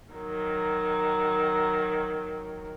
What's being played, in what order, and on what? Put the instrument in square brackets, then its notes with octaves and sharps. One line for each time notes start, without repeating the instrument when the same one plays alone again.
[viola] D#3 F#3